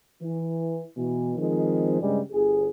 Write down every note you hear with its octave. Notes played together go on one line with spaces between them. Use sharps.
E3
B2 E3
D#3 F3 G#3 C4
G2 C#3 G3 G#3
G1 G#4